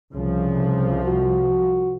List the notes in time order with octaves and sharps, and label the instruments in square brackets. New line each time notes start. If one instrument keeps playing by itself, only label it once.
[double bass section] C2 F3 [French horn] C#3
[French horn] F#4